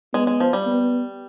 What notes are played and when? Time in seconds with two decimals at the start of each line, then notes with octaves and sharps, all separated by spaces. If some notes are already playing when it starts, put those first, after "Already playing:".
0.14 G#3 B3
0.27 G#3
0.40 F3
0.53 G3
0.66 B3